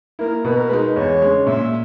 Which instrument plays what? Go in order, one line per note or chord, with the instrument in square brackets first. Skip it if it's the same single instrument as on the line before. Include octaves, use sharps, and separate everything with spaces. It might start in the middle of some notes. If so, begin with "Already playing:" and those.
[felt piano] A#3 E4 [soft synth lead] A#4
[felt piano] B2 [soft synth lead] B4
[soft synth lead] A#4
[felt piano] G#3 D#4 [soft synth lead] B4
[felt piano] E2 [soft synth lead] C#5
[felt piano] C#3 G#3
[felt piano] A#2 [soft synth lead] E5